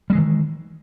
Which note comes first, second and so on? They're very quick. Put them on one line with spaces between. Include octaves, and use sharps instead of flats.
G3 G#3 E3 D#3